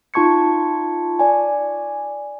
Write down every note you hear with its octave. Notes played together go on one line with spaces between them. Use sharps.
D#4 F4 A5 C#6 G#6 C#7
D5 G#5